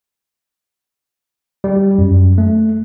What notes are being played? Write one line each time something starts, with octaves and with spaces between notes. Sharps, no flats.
G3
F#2
A3